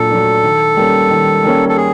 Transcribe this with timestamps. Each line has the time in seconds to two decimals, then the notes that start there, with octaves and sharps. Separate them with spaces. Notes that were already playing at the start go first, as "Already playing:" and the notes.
Already playing: A#2 F#3 D4 A4
0.11 F#3 A3 D4
0.44 D#3
0.77 G3 A#3 C#4
1.11 D#3
1.44 G3 A#3 C#4
1.69 A4
1.77 G#4